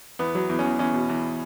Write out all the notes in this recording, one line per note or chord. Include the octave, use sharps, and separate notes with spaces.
E2 B3
F#3
E2
C#4
E2
E2 C#4
B2
E2